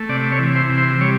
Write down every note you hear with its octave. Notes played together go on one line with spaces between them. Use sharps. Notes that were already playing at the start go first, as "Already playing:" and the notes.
Already playing: A3
C3 D5
C#5
E3
C5
C3
C5
G3 C#5